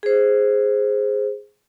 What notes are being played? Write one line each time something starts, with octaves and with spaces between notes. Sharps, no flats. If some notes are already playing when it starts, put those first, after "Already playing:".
G#4 C5